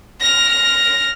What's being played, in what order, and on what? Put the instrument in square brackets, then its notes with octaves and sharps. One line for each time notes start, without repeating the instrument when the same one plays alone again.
[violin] F6 A#6